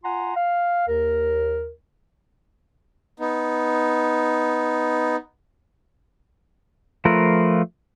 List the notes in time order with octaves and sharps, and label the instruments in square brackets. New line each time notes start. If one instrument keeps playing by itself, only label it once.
[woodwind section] F4 F#5 G#5 A#5 C6
F5
D#2 A#4
[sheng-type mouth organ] B3 D#4
[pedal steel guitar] F3 A3 F4 A#4 B4